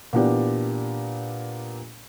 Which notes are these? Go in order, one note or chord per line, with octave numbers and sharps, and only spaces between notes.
A#2 E3 B3 D4 G4